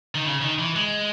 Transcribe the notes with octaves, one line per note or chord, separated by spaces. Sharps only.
D#3
C#3
D#3
E3
G#3